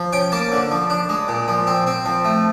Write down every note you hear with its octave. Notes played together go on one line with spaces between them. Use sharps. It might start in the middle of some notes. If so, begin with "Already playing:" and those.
Already playing: F3
C#4 G5
A#3 A5
D3
F3
D4
G#3
A#2
F3
C4
C4
F3
A3